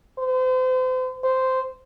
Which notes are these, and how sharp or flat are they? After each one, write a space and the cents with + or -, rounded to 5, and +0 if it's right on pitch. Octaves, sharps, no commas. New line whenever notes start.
C5 -35
C5 -10